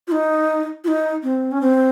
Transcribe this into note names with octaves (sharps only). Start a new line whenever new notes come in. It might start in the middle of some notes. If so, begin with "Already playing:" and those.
F4
D#4
F4
D#4
C4
C#4
C4